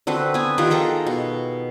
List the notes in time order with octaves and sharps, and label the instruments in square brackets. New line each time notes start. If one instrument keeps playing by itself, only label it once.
[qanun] D3 C4 F#4 B4
B3 G#5
D#3 F4 G4 F#5
G#4 A4 G5 A#5
B2